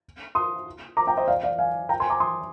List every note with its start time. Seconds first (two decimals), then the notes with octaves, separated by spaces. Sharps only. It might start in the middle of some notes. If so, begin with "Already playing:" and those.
0.35 C6 D#6
0.97 A#5 D6
1.07 G5 A#5
1.17 C5 D#5
1.28 D5 F5
1.43 D5 F5
1.58 F5 G#5
1.89 G5 A#5
2.00 G#5 C6
2.10 A#5 D6
2.20 C6 D#6